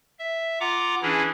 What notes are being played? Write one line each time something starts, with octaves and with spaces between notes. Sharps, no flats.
E5
F4 F#5 A#5 D6
E3 C#4 D4 E4 G#4